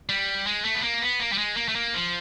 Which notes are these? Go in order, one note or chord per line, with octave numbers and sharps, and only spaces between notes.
G3
G#3
A3
B3
A#3
B3
A#3
G3
G#3
A#3
A3
A#3
F3